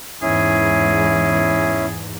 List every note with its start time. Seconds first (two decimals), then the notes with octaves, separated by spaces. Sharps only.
0.22 E2 G#2 C#4 E4 G#4